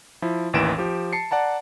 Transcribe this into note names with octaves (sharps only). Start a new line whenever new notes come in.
F3 E4
A1 D#2 E3 D7 E7
F3 G4
A5 C7 C#7
D5 F#5 A5 A#5